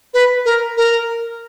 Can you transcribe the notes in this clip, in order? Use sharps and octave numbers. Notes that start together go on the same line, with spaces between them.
B4
A#4
A#4